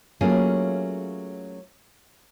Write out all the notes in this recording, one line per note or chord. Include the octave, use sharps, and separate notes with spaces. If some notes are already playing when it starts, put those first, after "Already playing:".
F#3 A3 A#3 C#4 F4 G#4